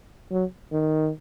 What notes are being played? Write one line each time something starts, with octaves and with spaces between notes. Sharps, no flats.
F#3
D#3